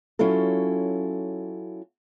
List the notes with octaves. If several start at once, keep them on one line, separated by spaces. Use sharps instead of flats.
F#3 C#4 E4 F4 A4